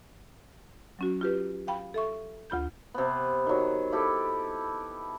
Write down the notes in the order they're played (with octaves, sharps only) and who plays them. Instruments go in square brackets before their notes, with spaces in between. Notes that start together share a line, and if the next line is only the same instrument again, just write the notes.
[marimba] F#3 C#4 F#4
F4 G4 B4
F5 G5 B5
A4 E5 C#6
D2 F4 B5 G6
[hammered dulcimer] C3 B3
D#3 F#3
E4 G4 A4